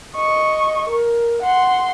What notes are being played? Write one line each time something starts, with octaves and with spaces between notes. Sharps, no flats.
D#5 C#6
A#4
F#5 C6